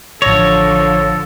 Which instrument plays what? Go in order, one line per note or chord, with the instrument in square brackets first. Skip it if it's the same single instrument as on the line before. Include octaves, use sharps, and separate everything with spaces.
[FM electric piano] A1 A#6 [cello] D3 F3 [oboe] A4 [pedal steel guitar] C#5